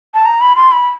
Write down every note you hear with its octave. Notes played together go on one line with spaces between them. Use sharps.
A5
A#5
B5
C6
B5